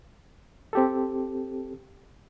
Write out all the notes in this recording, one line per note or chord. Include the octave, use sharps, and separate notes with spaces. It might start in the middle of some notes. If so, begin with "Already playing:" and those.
C4 G4 A4